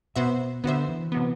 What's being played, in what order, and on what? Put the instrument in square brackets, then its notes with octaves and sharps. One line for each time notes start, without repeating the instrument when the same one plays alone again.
[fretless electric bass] B2 [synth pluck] B3 F#4 C5 E5
[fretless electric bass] D3 [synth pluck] B3 F#4 C5 E5
[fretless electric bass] E3
[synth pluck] C3 F#3 B3